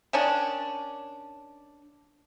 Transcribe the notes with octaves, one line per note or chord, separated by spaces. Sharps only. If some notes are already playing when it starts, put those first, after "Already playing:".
D#3 C#4 D4